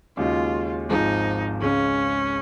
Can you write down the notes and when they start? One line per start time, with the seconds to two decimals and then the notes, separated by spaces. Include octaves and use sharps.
0.17 D#2 C#3 G#3 D#4 F4 F#4
0.89 G#1 G#2 F3 G#3 D#4
1.62 C#2 C#3 G#3 C#4